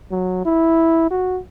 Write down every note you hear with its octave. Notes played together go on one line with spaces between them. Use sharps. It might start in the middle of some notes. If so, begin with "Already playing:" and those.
F#3
E4
F#4